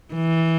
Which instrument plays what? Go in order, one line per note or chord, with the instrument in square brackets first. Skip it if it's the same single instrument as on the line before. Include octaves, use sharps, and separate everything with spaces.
[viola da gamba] E3